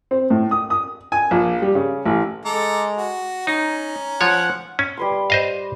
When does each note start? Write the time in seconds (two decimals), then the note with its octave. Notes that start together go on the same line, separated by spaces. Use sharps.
0.11 C4
0.30 A2
0.51 D#6
0.70 D#6
1.12 G#5
1.31 A#1
1.62 G3
1.75 C#3
2.05 A1
2.45 G#3 A4 A#5 D6
2.97 F#4
3.47 C#4 D#4 A#5
4.21 F3 C#5 F#5
4.79 C#4
4.97 G3 B4 C6
5.30 C5 D#5 F5